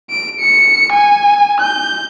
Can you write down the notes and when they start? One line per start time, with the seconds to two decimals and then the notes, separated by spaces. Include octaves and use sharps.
0.10 D7
0.40 C#7
0.93 G#5
1.60 G6